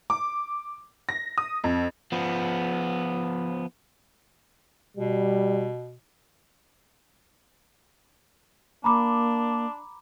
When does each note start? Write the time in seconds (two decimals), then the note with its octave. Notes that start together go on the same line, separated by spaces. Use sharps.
0.10 D6
1.09 A#6
1.38 D#6
1.64 F2
2.12 F3 B3
4.97 B2 G3
8.84 A#3 D4 A#5 B5 D6